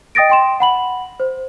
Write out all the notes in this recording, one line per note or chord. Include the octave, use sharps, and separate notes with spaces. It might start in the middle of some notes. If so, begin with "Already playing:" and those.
D#5 G5 D#6 A6 A#6 D7
G5 C6 E7
F#5 B5 F#7
C5